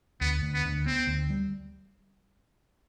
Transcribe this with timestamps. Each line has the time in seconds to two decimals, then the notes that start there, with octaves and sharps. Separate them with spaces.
0.20 D2 B3
0.42 D2
0.54 B3
0.64 D2
0.86 B3 C4
1.07 D2
1.30 G3